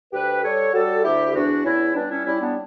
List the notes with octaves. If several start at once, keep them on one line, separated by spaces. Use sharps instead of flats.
D2 G4 B4
G3 A4 C#5
G3 F#4 A4
D2 E4 G4
E2 D4 F#4
E2 C#4 E4
G3 B3 D4
C#4 E4
G3 C#4 E4
B3 D4